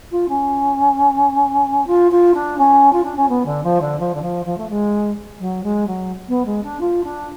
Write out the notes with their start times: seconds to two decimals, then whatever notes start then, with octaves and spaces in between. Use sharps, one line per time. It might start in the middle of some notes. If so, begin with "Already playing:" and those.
0.11 F4
0.28 C#4
1.86 F4
2.11 F4
2.34 D4
2.58 C#4
2.92 F4
3.03 D4
3.16 C#4
3.28 B3
3.45 D3
3.63 F3
3.81 D3
3.99 F3
4.14 D3
4.21 F3
4.45 F3
4.57 A3
4.69 G#3
5.39 F#3
5.63 G#3
5.86 F#3
6.28 B3
6.45 G#3
6.63 D4
6.80 F4
7.03 D4